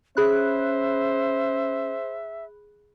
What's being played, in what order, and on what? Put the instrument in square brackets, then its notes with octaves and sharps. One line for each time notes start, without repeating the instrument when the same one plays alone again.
[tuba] C#4 [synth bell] G#4 B5 F#6 [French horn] C5 [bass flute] E5